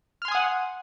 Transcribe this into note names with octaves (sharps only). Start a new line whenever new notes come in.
F#5 G#5 C6 D#6 F6